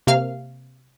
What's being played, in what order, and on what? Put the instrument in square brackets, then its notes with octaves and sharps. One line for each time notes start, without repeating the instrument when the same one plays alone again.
[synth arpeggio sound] C3 A#3 F5 F6